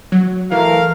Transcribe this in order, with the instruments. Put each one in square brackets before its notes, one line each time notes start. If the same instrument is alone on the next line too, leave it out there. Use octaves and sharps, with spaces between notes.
[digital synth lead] F#3
[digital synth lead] E3 [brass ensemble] A3 A#4 F5